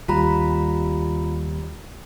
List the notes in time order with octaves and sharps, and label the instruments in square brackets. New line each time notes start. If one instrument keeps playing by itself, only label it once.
[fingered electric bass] D#2 G3 [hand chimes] F4 A#5 B5